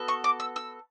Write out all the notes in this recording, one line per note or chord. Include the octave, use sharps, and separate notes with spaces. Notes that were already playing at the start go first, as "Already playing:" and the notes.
Already playing: B3 F#4 A4
C#6
D6
E6
E6